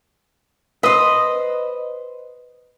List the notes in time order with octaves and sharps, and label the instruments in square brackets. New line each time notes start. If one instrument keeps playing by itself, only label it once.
[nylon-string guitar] B4 C5 [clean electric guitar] D#5